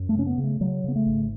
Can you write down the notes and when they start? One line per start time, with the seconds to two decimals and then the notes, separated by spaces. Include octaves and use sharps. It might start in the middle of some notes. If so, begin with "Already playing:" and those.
Already playing: F#2
0.09 A3
0.15 C#3 C#4
0.26 B3
0.38 C#3
0.44 A3
0.60 C#3 F#3
0.84 C#3 B3
0.96 A3
1.06 G#1